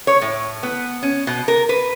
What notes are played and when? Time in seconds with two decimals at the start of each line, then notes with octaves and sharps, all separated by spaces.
0.07 C#5
0.21 A2
0.63 B3
1.03 C#4
1.27 B2
1.48 A#4
1.69 B4